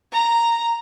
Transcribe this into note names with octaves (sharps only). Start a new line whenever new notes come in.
A#5